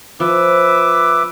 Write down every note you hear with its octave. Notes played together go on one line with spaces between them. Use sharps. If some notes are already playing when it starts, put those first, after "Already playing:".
F3 B4 E5 D6